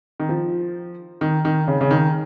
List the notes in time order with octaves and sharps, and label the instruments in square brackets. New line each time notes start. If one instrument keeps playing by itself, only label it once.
[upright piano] D#3
F3
D#3
D#3
C#3
C#3
D#3